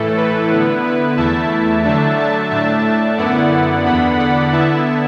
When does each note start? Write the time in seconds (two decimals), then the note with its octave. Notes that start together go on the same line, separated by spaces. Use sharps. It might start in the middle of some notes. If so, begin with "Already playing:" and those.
Already playing: A2 E3 A3 E4 A4
0.17 B4
0.49 D3 B3 E4
0.84 B4
1.17 E2 E3 A3 E4 E5 A5
1.84 D3 F#3 A3 D4 E5 A5
2.17 E5 A5
2.51 A2 A3 D4 E5 A5
3.18 F#2 D3 B3 E4 D5 F#5
3.85 E2 D3 B3 D4 F#5 B5
4.18 D5 F#5
4.52 D3 B3 E4 E5 A5